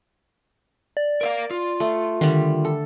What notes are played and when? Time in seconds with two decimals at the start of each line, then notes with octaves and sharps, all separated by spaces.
0.97 D5
1.21 A#4 E5 F5
1.51 F4
1.80 A3
2.21 D3 D#3 G3
2.65 A4